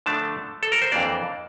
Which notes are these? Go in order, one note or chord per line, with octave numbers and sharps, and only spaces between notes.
D3 F3 A3 D4 A5
A4
A#4
C5
F2 E3 A#3 D4 D5